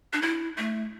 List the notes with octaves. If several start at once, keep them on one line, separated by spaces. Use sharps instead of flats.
D4
E4
A3